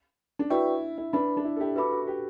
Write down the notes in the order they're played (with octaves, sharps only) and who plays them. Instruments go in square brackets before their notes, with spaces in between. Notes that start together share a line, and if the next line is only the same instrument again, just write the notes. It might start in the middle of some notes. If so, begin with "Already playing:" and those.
[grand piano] D4
[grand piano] E4 [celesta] F#4 B4 D5 G5 C#6
[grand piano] E4
[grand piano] D4 [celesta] B4 E5 B5
[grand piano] D4
E4
A4
E4 G4
[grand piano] F#4 A4 [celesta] B4 E5 B5 D6
[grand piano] F#4 A4
G4 B4